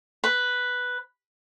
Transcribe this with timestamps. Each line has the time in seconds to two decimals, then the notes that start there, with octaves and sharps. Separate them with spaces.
0.24 B4